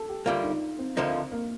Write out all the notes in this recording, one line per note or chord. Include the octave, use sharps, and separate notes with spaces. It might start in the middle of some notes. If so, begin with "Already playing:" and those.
Already playing: A4
G4
D2 D3 G3 A#3 F4
D#4
C4
D2 D3 F3 A#3 D#4
A#3